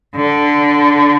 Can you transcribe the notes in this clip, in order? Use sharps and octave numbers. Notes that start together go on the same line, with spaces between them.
D3